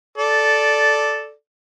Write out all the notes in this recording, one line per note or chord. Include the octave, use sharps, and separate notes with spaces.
A4 D5